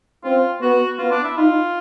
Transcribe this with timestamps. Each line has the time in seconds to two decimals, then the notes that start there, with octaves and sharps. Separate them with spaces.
0.24 C4 F4
0.61 B3 F#4
0.98 B3 F4
1.12 D4
1.24 E4
1.37 D#4 F4